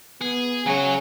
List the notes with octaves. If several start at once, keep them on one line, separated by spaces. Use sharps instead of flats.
B3 G#4
C#3 F#3 C#5 G#5